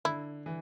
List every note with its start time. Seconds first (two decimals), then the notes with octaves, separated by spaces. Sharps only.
0.05 D3 E4
0.46 E3